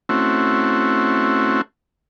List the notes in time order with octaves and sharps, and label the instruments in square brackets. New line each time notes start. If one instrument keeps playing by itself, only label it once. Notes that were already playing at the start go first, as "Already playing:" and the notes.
[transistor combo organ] A3 C4 C#4 E4 F#4